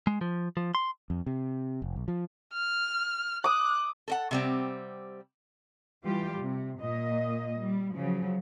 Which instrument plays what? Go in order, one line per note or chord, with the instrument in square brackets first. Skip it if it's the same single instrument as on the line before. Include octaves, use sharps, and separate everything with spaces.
[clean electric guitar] G#3
F3
F3
C6
[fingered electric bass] F2
C3
F1
B1
F3
[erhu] F6
[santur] D6 D#6 [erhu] F#6
[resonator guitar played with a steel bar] A4 A#4 F#5
C3 G3 C4
[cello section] E3 G3 F4 G4
C3
A#2 A#3 D#5
G3
C#3 F3 F#3